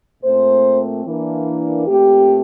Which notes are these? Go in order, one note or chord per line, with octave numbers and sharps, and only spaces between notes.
A#2 A3 C4 C5
E3 A#3 D4
A#2 A3 C4 G4